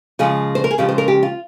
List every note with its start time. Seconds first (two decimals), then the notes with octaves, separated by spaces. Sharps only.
0.19 C#3 F3 G#3 G#4
0.55 C5
0.64 A#4
0.71 G#4
0.78 C#3 F3 G#3 C#4 G4
0.89 C5
0.98 A#4
1.08 G4
1.23 F4